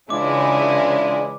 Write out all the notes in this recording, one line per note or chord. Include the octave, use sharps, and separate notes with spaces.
C#3 E3 G#3 D4 E4 F4 D5 D6